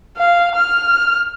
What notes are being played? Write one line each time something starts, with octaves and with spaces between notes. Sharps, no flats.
F5
F6